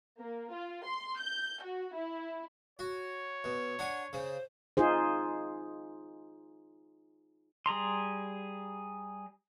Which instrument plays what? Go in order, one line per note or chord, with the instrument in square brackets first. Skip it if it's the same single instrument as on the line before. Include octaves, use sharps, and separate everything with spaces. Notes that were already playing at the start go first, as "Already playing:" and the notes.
[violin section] A#3
F4
C6
G6
F#4
E4
[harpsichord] F#4 [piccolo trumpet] C#5
[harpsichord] B2
[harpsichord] D4 G#5 [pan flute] F#5
[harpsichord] C#3 [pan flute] C5
[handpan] D#4 F4 G#4 C5
[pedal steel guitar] G3 G#4 A#5 C6